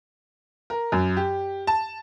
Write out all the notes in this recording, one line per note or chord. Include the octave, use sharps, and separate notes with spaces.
A#4
F#2
G4
A5